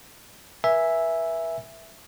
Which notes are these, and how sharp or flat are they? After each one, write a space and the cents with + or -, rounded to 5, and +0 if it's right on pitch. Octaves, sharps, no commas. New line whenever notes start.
B4 -45 E5 +0 G#5 -5